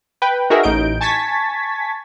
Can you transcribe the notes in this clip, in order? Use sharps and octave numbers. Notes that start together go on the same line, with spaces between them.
B4 G5
D#4 F#4 G#4 A#4 E5
A1 D#4 G6 D7
G#5 A5 C#6 G#6 A6 B6